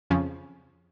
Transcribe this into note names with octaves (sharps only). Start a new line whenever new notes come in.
F2 C#3 F3 C#4